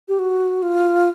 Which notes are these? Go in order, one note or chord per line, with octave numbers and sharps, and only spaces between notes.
G4
F#4
F4